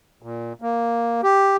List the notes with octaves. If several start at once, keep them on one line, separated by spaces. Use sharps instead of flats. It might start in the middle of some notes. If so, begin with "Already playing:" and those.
A#2
A#3
G4